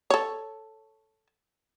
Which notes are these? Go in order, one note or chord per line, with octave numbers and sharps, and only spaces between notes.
A4 C#5